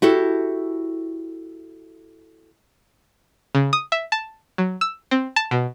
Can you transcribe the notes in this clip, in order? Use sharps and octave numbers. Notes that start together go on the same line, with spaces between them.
E4 F#4 G4 A4
C#3
D#6
E5
A5
F#3
E6
C4
A5
B2